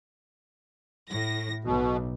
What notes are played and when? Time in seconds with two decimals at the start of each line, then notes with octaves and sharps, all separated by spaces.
1.10 A2 A#6
1.64 B1 B2